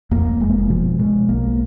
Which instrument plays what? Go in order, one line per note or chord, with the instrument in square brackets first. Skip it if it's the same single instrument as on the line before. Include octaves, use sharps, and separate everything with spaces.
[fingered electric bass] F2 A#3
F1 G#3
A#3
G#3
B2 F3
B2 G#3
B1 A#3